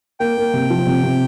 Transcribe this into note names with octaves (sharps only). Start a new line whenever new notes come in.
A#3 G5
A#3
C3
F3
C3
C3